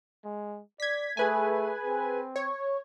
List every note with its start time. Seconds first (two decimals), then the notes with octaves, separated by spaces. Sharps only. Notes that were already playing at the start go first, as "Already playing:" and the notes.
0.24 G#3
0.80 D5 G#6 B6
1.17 A3 G#4 B4 G#5
1.86 C4
2.36 C#5